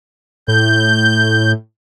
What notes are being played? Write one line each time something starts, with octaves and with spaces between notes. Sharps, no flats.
A2 G6